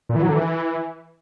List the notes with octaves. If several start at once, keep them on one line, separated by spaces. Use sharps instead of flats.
A#2
E3
F#3
D3
E3